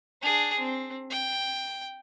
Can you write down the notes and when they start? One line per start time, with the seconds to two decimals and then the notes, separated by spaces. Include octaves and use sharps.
0.22 D4 G#4
0.59 C4
1.11 G5